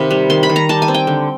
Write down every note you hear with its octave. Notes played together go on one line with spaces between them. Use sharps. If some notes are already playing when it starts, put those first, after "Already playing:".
Already playing: C3 D#3 F5 B5
G3
D#3 C6
B5
D#3
A#5
G3 A5
G#5
C4
G5
D3